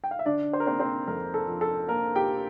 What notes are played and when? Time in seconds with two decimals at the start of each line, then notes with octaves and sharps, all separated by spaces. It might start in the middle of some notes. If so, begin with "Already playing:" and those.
0.04 G5
0.11 F5
0.19 E5
0.26 D3 D4 D5
0.53 C5
0.60 A#4
0.67 A#3 C4 C5
0.80 C4 C5
1.08 F2 A#4
1.34 A4
1.48 F3
1.61 A4
1.88 A#3 A#4
2.16 G4 G5